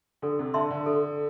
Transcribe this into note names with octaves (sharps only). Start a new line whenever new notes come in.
D3 A4
C3
D3 E5 A5 C6
D3
A4